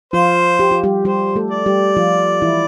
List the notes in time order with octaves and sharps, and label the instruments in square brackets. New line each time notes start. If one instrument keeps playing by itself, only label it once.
[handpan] F3 F4 [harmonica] C5
[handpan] G4
F4
G3 G4
[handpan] G3 G4 [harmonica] C5
[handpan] A3 A4
[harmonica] D5
[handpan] G3 G4
F3 F4
E3 E4